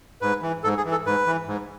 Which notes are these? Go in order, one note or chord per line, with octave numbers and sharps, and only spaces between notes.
G#2 B4
E3
G#2 A4
G#4
E3
A4
G#2 B4
E3
G#2